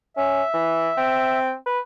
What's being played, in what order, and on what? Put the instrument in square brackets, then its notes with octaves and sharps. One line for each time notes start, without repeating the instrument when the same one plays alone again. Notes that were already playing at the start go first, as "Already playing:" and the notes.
[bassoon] C#4 [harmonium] E5
[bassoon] E3
C4
B4